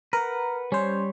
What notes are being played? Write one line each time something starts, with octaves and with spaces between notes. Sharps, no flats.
A#4 B4 F#5
G3 C#4 C5 C#5